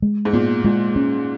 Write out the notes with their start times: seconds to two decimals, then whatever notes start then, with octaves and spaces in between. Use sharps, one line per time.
0.02 G#3
0.25 G#2
0.33 A#2 B3
0.64 A#2 G#3
0.96 C#4